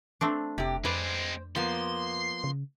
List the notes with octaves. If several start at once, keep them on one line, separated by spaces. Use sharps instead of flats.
A3 C4 D4
F1 C3 G4
F2 G#3 C4 B4 C5 D5
F3 A#3 B3 C6
C#3